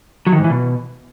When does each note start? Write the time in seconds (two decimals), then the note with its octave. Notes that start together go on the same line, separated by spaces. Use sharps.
0.27 F#3
0.32 D#3
0.38 G#2
0.44 E3
0.50 B2